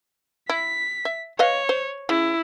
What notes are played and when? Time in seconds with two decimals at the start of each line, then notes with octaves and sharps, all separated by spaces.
0.49 E4 B6
1.05 E5
1.39 B4 C#5 D#5 F5
1.69 C5
2.09 C#3 E4